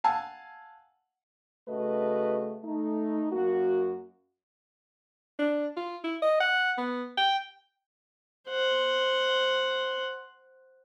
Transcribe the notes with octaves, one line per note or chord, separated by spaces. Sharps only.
F5 F#5 G#5 A5 E6
C#3 A3 F#4 B4 D#5
A3 D#4
F#2 A#3 F#4
D4
F4
E4
D#5
F#5
B3
G5
C5 F#5